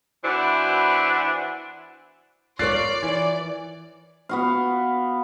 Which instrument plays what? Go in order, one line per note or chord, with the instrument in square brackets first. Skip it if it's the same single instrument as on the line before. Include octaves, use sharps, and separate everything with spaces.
[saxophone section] E3 B3 D4 E4 F#4 C5
[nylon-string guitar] F4 A#4 C#5 [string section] D5 [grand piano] F#6 A6 C7
[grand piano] E3
[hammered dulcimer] B3 F#4 F5